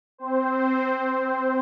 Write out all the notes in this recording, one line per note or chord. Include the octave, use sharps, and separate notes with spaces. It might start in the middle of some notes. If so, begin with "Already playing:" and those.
C4 C5